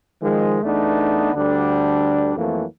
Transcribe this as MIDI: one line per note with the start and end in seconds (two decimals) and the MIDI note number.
0.22 0.59 51
0.22 0.59 53
0.22 0.59 56
0.63 1.30 40
0.63 1.30 57
0.63 1.30 59
0.63 1.30 62
0.63 1.30 63
1.34 2.31 38
1.34 2.31 50
1.34 2.31 55
1.34 2.31 62
2.36 2.63 41
2.36 2.63 52
2.36 2.63 54
2.36 2.63 57
2.36 2.63 58